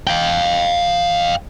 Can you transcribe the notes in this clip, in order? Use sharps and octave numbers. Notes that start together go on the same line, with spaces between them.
F5 G5